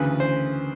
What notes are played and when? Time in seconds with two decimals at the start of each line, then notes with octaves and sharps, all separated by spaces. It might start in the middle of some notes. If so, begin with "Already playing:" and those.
Already playing: D2 C#3 E3 B4
0.20 C5